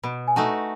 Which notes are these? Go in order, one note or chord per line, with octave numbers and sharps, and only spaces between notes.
B2 B5
G#5
A3 D#4 F#4 A5